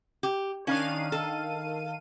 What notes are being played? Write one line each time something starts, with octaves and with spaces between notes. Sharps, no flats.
G4
D#3 C#4 D4 F5 D#7
A4